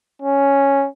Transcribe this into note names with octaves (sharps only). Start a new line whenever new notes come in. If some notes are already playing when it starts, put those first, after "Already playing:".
C#4